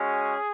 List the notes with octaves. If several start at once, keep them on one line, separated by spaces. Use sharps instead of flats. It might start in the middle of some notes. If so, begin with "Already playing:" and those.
Already playing: G#3 C#4 F#4 G#4